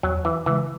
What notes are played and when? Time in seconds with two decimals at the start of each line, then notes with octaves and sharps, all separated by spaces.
0.03 E2 F#3
0.25 E3
0.46 C#3 E3 G#3